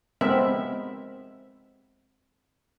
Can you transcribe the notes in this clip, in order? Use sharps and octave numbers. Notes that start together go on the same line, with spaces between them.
G#3 B3 C4 A#4 E5